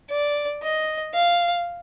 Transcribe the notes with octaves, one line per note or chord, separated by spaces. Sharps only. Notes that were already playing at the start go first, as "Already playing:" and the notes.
D5
D#5
F5